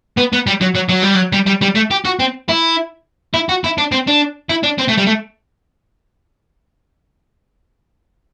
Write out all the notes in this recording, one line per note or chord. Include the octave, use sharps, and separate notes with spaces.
B3
B3
G3
F#3
F#3
F#3
G3
F#3
G3
G3
G3
A3
G4
F#4
C4
E4
E4
F#4
E4
D4
C4
D4
E4
D4
C4
A3
G3
A3